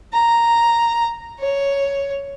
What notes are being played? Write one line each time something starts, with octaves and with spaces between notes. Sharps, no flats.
A#5
C#5